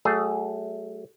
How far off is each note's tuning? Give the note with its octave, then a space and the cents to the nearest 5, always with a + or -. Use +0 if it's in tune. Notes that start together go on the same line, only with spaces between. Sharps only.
F#3 +40 A3 +0 G#4 +0